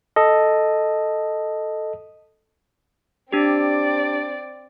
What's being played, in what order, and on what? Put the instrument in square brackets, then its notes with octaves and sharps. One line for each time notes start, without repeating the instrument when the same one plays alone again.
[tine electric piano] A4 D#5
[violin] C4 D5 [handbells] D4 G4